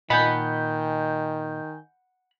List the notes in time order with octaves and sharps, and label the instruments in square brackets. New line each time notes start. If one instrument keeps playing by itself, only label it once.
[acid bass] A#2 [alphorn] D#3 [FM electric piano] D#5 G#5 G6 [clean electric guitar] F#5 B5